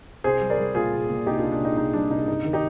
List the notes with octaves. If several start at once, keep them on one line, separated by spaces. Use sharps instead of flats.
C2 G#4 C5
G3
A#4 D5
G3
A#2 F4 G#4
A#2
A#2
C2 D#4 G4
D4 F4
C2
D4
A#2
D#4
C2 D#4
G3 D4
C2 D#4
G2 D#4
D#3
D#4 G4